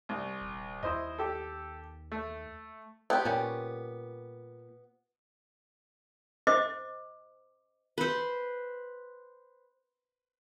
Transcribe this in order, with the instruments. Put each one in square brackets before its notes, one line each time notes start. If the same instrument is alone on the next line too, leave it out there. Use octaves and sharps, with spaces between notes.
[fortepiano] C2
[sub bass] D#1
[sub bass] D#2 [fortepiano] E4 C5 D#5
[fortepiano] G4 A4
A3
[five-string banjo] B3 G4 [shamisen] C4
[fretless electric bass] A#2 [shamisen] G3 C#4
[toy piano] C5 D#5 D6
[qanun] B4 C5